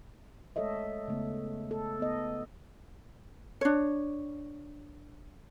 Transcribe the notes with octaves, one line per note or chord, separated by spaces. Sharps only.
G#3 A3 A4 C#5 D#5 E5
C#3 A3 B3
A4
B3 D#5
D4 C#5